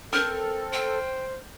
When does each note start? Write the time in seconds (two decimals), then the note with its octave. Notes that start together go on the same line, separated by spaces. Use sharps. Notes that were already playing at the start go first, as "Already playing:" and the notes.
0.13 C4 A4 A#4 F6 G6
0.72 C5 G5